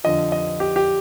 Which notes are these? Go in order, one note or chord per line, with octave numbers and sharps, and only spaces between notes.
F2 D3 F3 D#5
D#5
G4
G4